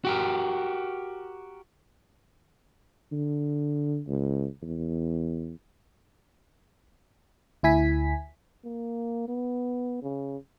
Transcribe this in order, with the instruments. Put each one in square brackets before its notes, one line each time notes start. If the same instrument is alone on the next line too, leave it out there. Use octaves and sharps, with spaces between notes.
[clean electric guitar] F#4 G4 A#4
[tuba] D3
C#2
E2
[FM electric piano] D2 E4 G#5 B6
[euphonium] A#3
B3
C#3